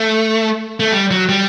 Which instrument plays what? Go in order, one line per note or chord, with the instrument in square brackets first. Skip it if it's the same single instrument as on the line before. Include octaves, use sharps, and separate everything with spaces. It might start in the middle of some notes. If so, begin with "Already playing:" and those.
Already playing: [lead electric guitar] A3
A3
G3
F#3
G3